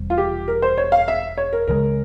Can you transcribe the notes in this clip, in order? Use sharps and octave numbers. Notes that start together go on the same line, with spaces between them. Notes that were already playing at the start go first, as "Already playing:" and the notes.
Already playing: E1 E2 C3 G3
F4
G4
A#4
C5
C#5
F5
E5
C#5
A#4
C#2 C#3 E3 G#3 A#4